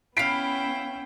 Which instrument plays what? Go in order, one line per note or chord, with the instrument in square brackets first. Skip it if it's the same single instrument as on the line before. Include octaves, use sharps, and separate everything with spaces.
[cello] B3 C#4 [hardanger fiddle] E4 G5 [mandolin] F5 B5 [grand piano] C7 D7